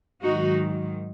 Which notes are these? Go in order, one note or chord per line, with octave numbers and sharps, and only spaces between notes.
G#2 D#3 F#3 D#4 F#4